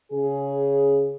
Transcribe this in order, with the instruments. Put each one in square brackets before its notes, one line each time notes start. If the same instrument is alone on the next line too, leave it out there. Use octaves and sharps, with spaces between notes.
[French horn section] C#3 G#4